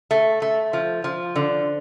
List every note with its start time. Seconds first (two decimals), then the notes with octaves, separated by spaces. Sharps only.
0.11 A3
0.42 A3
0.73 F3
1.04 F3
1.36 D3